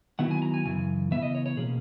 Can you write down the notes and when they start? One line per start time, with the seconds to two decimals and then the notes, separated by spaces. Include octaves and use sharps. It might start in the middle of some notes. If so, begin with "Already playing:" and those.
0.19 D#3 F#3 B3 E4 F#5
0.31 G#5
0.42 A#5
0.54 G#5
0.65 F#2 C#3 E3 G#5
1.11 C#3 E3 B3 E5
1.22 D#5
1.35 C#5
1.46 C#5
1.57 B2 A#3 C#4 G#4